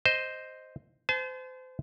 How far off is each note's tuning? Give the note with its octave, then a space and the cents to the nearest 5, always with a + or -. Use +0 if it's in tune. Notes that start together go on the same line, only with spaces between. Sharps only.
C5 +0 D#5 +0
C5 -30 A5 -40